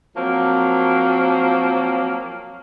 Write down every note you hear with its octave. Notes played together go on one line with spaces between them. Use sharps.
F3 F#3 A#3 C4